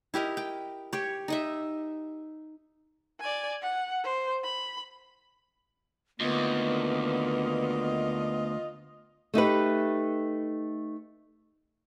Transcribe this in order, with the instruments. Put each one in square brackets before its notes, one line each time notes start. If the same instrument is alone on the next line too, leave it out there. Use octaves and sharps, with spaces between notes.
[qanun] E4 G4 A#4 D#5
G5
G4 C#5
D#4 D#5 E5
[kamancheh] D5 G#5
F#5
C5
B5
[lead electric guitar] D2 [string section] D3 D#3 A#3 [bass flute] B3 [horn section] F4 D#5
[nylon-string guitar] A3 D#4 G4 B4